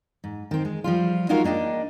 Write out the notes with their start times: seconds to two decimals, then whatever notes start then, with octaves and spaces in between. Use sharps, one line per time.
0.24 G#2
0.51 D#3 C4
0.65 G#3
0.84 F3 G3 F4
1.29 G#3 D#4 F4 F#4 A#4 F5
1.44 A#3 D4 D#5 G5